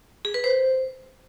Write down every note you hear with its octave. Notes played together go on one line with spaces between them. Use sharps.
G#4
B4
C5